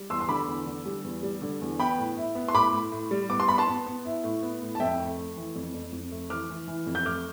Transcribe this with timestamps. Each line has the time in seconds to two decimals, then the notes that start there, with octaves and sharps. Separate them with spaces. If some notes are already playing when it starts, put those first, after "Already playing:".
Already playing: G3
0.10 E2 C6 E6
0.21 C6
0.29 D3 B5 D6
0.48 E2
0.67 D3
0.86 G3
1.05 E2
1.23 G3
1.42 D3
1.61 E2
1.79 B3 G5 B5
1.98 A2
2.17 E4
2.35 B3
2.48 C6
2.55 A2 B5 D6
2.73 A2
2.92 A2
3.11 G3
3.29 B3 D6
3.40 C6
3.48 B3 B5
3.58 A5 C6
3.68 B3
3.86 B3
4.05 E4
4.24 A2
4.43 B3
4.62 A2
4.75 A5
4.80 F2 E5 G5
4.99 A3
5.18 A3
5.36 E3
5.56 F2
5.74 F2
5.93 F2
6.12 A3
6.30 E3 D6 F6
6.50 E3
6.68 E3
6.87 F2
6.95 G6
7.05 A3 D6 F6